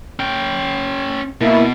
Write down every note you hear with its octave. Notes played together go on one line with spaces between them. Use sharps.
C#4 G5
B2 A#3 E4 A#4